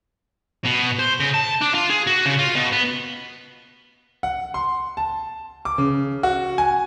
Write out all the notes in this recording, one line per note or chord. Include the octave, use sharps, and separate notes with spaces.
B2
C5
C#3
A5
D4
F4
G#4
F#4
C#3
F4
B2
B3
F#5
C6
A5
D6
C#3
F#4
G#5